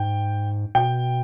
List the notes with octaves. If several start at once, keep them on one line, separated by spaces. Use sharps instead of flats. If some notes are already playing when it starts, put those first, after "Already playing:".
Already playing: G#2 G5
B2 G5